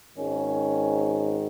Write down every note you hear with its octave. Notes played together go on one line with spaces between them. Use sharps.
G#1 G#2 D#3 C#4